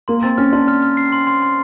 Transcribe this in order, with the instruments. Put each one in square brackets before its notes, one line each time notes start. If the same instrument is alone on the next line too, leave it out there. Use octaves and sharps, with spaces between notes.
[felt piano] A#3 [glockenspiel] C6
[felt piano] C4 [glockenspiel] A6
[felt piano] C#4 [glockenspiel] F6
[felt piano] D4 [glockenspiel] C6
[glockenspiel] F6
F6
C7
C6
C6
C6